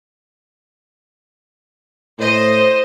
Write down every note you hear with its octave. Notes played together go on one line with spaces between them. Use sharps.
A2 C5 D#5